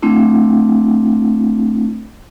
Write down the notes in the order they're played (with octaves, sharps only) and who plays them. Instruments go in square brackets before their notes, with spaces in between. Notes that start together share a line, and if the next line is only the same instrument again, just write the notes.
[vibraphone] A3 C4 D4 E4